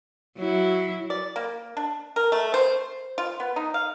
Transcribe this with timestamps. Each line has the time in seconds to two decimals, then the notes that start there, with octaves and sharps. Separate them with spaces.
0.37 F#3 E4
1.10 D5
1.36 A#3
1.77 D4
2.16 A#4
2.32 A3
2.54 C5
3.18 F4
3.40 B3
3.56 D#4
3.74 F5